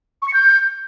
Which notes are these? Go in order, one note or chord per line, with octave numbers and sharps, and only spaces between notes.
C#6
C#7
G6